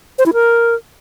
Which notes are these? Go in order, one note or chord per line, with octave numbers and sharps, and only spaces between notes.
C5
E4
A#4